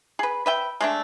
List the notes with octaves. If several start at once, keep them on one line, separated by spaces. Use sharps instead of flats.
G#4 B4
B4 E5 G5
G#3 A3 D4